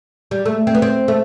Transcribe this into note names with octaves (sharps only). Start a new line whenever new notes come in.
G3
A3
C4
B3
C4
A3